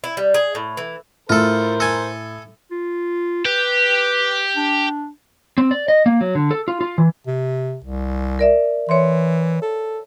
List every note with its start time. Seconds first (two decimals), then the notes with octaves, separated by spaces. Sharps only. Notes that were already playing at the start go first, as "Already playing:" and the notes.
0.04 E4
0.17 G3
0.34 G#4
0.55 A2
0.77 E3
1.29 A2 F4 A4 A#4 C5
1.80 A4 G#5
2.71 F4
3.45 G4 B4
4.56 D4
5.58 C4
5.71 D5
5.88 D#5
6.06 A#3
6.21 F#3
6.35 D3
6.51 A4
6.68 F4
6.81 F4
6.98 E3
7.27 C3
7.84 C2
8.39 A#4 D5 E5
8.89 E3 C#5 E5 C6
9.62 A4